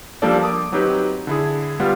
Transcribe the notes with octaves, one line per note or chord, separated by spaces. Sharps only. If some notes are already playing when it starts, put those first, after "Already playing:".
F3 G3 A#3 D4 A4 D5
D6 D#6
F#3 C4 D#4 G4 B4
D3 E4 G#4
G3 B3 F4 F#5